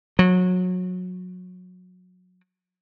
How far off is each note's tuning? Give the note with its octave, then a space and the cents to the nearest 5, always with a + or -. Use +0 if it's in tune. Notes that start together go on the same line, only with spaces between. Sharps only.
F#3 -25